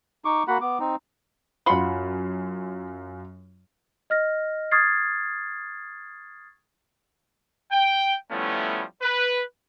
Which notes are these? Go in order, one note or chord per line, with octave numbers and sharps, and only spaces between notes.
D#4 C#6 D6
A#3 F#4 F#5 B5
B3 D6
C4 D#4
F#2 F4 F#5 B5 C6
D#5 F6 A#6
C#6 D#6 F6 G#6 A6 C7
G5
F3 G3 A3 B3 C#4 E4
B4